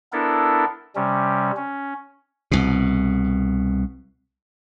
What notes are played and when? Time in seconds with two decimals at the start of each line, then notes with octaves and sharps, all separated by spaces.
0.13 B3 D4 E4 A4 A#4
0.96 C3 G3 C#4
1.56 C#4
2.52 C2 B2